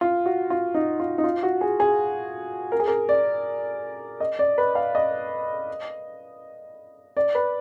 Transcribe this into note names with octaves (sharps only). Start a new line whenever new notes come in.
F4
F#4
F4
D#4
F4
D#4
F4
F#4
G#4
G#4
A#4
G#4
A#4
D5
D#5
D5
B4
F5
D#5
D5
B4